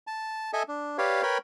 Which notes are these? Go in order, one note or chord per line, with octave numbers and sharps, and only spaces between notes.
A5
A4 D#5 E5 G#5
D4
G4 B4 C#5 D5 F5
A#4 B4 C#5 G5 B5